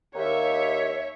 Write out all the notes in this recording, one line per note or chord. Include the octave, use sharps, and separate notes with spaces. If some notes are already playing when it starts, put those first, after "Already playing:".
D#2 C#5 E5